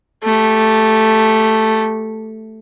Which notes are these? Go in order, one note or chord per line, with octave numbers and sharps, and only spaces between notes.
A3 G4